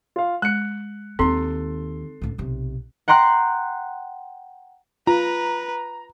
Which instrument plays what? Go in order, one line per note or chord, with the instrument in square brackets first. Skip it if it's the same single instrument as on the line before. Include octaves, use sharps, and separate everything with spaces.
[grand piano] F4 F5
[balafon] G#3 [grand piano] F#6 C#7
[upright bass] D#2 D#3 [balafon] C4 [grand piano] A4 C6
[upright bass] C#2 A2
B1 C3
[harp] F#5 G5 A#5 C6 F#6
[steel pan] F4 [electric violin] B4 [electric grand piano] A#5